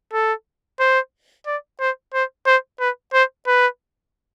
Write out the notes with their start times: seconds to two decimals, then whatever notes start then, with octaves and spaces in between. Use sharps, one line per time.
0.13 A4
0.80 C5
1.47 D5
1.80 C5
2.14 C5
2.46 C5
2.80 B4
3.13 C5
3.47 B4